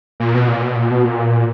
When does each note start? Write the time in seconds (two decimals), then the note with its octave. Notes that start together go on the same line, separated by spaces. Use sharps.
0.20 A#2
0.34 B2
0.48 A#2
0.62 B2
0.76 A#2
0.91 B2
1.05 A#2